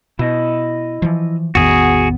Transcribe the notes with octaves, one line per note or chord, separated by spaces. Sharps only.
B2 E4 D#5
E3 F3
A1 E2 D#3 B3 F#4 G#4